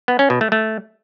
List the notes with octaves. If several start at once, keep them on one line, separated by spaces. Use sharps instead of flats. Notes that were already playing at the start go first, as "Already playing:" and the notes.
B3
C#4
B2
A3
A3